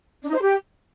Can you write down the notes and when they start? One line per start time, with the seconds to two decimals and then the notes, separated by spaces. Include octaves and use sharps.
0.22 D4
0.29 D#4
0.35 C5
0.41 G4